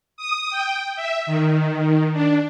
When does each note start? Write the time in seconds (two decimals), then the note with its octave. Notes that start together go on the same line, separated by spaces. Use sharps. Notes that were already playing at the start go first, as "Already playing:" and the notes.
0.17 D#6
0.50 G5
0.96 E5
1.26 D#3
2.13 D4